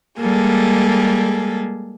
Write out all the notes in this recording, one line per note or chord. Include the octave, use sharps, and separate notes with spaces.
G3 G#3 A#3 G#4 A4